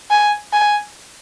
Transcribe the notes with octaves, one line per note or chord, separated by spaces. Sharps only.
G#5
G#5